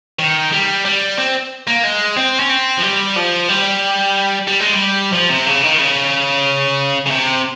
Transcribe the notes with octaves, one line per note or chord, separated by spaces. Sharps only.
D#3
G3
G3
C4
A#3
G#3
C4
C#4
C4
F3
G3
F3
G3
G3
G#3
G3
F3
C3
C#3
D#3
C#3
C#3
C3